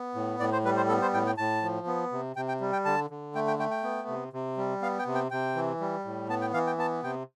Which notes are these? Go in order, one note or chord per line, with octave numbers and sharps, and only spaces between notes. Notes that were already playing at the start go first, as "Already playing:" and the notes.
Already playing: B3
A2
A2 D5
C5
G3 B4
C5
B3 A4
C5
A2 G5
G5
A2 A5
F3
B3
C3
C3 G5
G5
G3
G5
D3 A5
D3
A3 G5
G5
A3 G5
G5
B3
C3
C3
G3
B3 F5
G5
C3
G5
C3 G5
E3
G3
A2
B3 A5
G5
E3 F5
G5
B3 A5
C3 G5